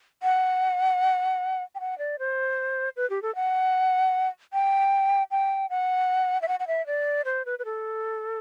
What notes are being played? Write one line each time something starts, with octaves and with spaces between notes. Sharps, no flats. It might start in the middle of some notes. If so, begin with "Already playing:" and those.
F#5
G5
F#5
D5
C5
B4
G4
A4
F#5
G5
G5
F#5
E5
F#5
F#5
E5
D5
C5
B4
B4
A4